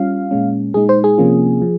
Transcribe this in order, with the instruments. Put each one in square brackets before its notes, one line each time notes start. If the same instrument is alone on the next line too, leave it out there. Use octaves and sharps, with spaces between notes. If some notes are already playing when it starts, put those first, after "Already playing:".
Already playing: [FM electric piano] G3 C#4 F4 F5
A#2 G#3 C#4
A#2 G#3 D#4 G#4
C5
G#4
C3 F3 A#3 C#4 F4
F3